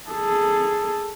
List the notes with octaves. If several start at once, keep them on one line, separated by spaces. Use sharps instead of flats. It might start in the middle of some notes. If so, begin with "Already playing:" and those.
G#4 A4